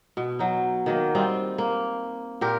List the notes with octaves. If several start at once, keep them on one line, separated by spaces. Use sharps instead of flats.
B2
F#3 D#4
D#3 F#3 A#3
G3 C4 D#4 F4
A#3
A#2 G4 A#4